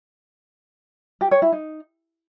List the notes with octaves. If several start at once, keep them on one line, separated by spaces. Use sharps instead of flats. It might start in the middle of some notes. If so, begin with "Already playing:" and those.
G4
C#5
E4
D#4